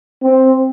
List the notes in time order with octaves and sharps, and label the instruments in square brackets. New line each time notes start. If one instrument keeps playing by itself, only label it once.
[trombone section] C4